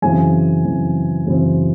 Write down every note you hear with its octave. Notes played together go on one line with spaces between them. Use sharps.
F#2 C#3 E3 C4 G#5
F#2 C#3 E3 C4
F#2 C#3 E3 C4